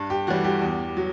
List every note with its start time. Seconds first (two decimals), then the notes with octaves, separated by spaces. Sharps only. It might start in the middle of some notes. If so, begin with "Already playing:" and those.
Already playing: G2
0.10 G4
0.27 E3 G3 F#4
0.44 G4
0.61 E2
0.97 F#3